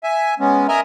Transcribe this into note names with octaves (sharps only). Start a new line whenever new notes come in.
E5 G#5
G#3 B3 C#4
A#4 D#5 E5 G#5 A#5